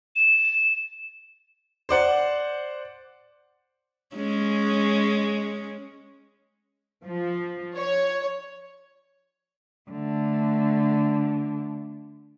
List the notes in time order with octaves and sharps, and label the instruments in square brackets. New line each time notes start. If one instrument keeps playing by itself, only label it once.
[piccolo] E7
[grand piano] C5 D5 F#5
[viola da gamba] G#3 C#4
[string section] F3
C#5
[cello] D3 A3